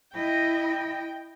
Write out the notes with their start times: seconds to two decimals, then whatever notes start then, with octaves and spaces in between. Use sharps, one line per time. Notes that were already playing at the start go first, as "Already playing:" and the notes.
0.15 E4 D#5 G5